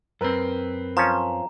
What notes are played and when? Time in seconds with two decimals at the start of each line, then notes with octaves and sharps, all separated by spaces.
0.21 F#2 C4 A#4 B4
0.97 F3 C#4 A#5